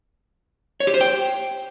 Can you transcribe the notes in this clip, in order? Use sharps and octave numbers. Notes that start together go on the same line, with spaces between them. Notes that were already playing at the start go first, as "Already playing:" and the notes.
C#5
G4
C5
G5